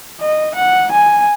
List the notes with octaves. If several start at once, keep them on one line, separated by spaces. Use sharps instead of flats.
D#5
F#5
G#5